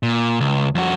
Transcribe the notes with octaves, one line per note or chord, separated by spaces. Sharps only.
A#2
C#2
F2 F#4